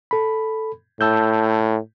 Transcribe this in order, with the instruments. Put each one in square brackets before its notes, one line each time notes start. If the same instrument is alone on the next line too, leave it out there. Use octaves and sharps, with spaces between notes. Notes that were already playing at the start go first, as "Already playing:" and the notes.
[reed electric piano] A4 B5
[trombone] A2 [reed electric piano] A5 E6 G6